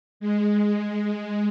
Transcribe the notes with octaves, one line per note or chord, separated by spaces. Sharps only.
G#3